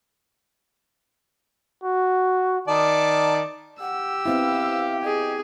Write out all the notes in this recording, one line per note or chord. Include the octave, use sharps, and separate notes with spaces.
F#4
D#3 D5 A5
G4 F#5 E6
B3 C4 E4 F5
G#4 D#5